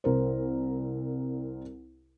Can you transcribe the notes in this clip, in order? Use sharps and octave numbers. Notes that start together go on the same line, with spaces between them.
C2 A#4 C5